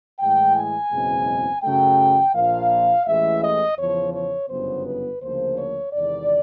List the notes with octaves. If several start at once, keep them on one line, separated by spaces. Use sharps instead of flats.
A2 E3 G#3 G5
G#5
F#1 E2 B2 G#3 C4
F#2 C#3 F#3 A3 G5
A#1 A#2 F3 A#3 F5
A1 A2 E3 G#3 E5
D#5
E2 C#3 F3 C#5
C#5
G1 F#2 C#3 F#3 B3 C5
B4
D2 C#3 F3 A#3 C5
C#5
E2 C3 D#3 G#3 B3 D5